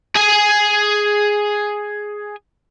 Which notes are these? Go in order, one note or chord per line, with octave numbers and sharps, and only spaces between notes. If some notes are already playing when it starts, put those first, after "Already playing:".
G#4 G#5